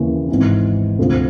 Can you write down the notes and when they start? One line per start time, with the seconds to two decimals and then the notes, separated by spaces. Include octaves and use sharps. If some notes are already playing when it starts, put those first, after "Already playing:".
Already playing: D#2 C#3 E3
0.28 G#1 G#2 E3
0.99 D2 C3 F3